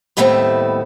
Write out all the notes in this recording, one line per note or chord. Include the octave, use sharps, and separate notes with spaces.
D#2 A2 G3 A3 B3 C4